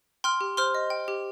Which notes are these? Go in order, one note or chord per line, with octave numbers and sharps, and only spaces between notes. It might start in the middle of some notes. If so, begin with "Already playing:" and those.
G5 C6 F6
G4
C5 C6 F6
D#5
G5
G4